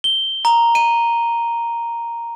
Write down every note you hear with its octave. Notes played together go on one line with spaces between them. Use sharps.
G7
A#5
D#7